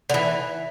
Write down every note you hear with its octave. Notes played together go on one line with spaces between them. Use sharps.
D3
E3